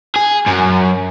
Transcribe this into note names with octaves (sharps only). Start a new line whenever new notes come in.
G#4
F#2